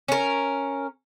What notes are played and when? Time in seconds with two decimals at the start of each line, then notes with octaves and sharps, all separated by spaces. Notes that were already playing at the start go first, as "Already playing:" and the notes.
0.08 C#4 A#4